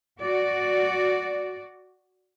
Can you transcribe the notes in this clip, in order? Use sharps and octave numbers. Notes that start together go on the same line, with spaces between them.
F#4 D5